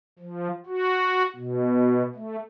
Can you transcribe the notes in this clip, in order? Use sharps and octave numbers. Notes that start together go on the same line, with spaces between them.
F3
F#4
B2
A3